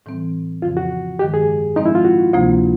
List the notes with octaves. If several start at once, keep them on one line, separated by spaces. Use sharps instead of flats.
A2 E3 G3 C4
F2 C#3 F3 F4
F#4
G2 D#3 G#3 G4
G#4
A2 F3 G#3 C4 D#4
E4
F4
F#4
D2 C3 F3 A#3